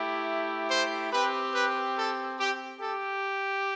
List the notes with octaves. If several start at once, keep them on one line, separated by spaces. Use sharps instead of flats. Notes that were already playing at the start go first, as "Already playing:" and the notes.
Already playing: A3 E4 G4
C5
C4 G4 B4
B4
A4
G4
G4 A4